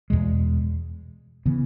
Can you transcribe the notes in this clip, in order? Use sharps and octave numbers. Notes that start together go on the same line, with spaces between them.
E2 B2 G#3
C#3 E3 B3